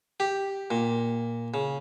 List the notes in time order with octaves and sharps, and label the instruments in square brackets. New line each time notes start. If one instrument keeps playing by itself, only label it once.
[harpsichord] G4
A#2
C#3